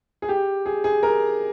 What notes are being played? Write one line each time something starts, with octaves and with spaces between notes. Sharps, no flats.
G#4
G4
G#4
G#4
A#4